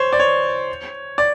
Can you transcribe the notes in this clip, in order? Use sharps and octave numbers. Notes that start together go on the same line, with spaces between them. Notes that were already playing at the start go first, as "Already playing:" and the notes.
Already playing: C5 C#5
D5
C#5
D5